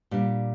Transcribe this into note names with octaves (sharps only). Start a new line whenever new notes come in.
A#2 G3 D4